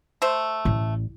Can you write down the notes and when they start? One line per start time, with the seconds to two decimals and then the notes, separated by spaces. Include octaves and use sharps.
0.22 A3 C5
0.65 A1